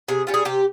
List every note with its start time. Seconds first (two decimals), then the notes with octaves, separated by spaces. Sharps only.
0.08 C3 G#4
0.27 G3 C#4 F4
0.34 G#4
0.45 C3 G4